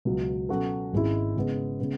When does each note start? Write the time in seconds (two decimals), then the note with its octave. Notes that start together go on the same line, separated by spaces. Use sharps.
0.05 C#2 B2 F#3
0.49 B2 F#3 C#4 F#4 A4
0.93 G#1 G#2 G#3 C#4 E4
1.36 C#3 G#3 B3
1.80 C#3 G#3 B3